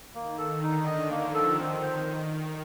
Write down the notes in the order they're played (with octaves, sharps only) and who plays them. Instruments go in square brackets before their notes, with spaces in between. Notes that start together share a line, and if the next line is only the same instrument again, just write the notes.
[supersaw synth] D#3 [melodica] A#3
[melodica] A4
[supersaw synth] D3
[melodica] D#4
[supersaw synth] D3 [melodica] D#5
[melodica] A#3
[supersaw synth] F3
[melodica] A4
[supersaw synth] D#3 [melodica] C4
[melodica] C5